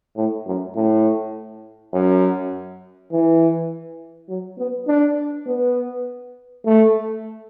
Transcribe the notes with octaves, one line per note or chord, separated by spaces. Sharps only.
A2
F#2
A2
F#2
E3
F#3
B3
D4
B3
A3